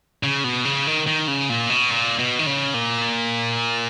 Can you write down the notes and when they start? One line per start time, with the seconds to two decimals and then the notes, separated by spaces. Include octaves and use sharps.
0.23 C#3
0.44 B2
0.65 C#3
0.87 D#3
1.07 D#3
1.28 C#3
1.49 A#2
1.70 B2
1.91 A#2
2.19 B2
2.39 D#3
2.47 C#3
2.74 A#2